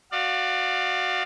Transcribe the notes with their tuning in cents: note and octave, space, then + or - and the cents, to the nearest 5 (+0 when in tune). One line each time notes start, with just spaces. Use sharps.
F#4 +0 D5 +25 F5 +0